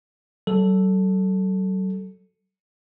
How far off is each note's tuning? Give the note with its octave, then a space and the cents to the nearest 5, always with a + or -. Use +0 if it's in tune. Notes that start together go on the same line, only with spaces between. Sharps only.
F#3 +40 A4 +0